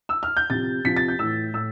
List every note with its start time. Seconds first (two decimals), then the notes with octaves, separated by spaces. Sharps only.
0.09 E6
0.23 F6
0.37 G6
0.50 C3 F3 A6
0.85 C3 F3 B6
0.96 A6
1.08 G6
1.19 A2 E3 E6
1.54 A2 E6